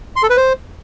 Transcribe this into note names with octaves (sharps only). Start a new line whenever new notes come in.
C6
A4
B4
C5